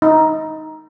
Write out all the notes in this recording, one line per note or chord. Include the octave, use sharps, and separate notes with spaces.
D#4